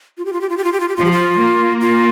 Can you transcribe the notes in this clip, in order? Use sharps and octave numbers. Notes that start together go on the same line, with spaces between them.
F4
G4
F4
G4
F4
G4
F4
G4
F4
G4
F3 F4
G4
F4
A#3
F4